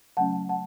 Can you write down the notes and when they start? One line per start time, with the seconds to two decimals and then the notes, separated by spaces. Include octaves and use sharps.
0.17 C#3 F#3 A3 C#4 F#5 A5
0.49 F#5 A5